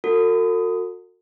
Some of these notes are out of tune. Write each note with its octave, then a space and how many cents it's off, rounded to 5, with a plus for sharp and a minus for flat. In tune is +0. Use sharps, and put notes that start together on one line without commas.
F#4 -25 A4 +45